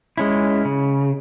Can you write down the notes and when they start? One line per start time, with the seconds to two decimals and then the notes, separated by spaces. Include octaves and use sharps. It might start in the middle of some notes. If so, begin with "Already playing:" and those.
0.17 G#3 C#4 E4
0.65 C#3